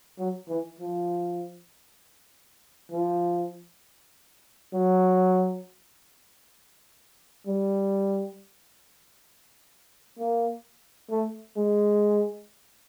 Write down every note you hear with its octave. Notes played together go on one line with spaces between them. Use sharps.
F#3
E3
F3
F3
F#3
G3
A#3
A3
G#3